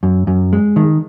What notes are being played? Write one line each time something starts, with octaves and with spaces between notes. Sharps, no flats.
F#2
F#2
G#3
D#3